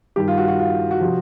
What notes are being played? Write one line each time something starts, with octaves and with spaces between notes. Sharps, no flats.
G2 D#3 G3 G4
F4
F#4
F#4
F4
F#4
C3 F3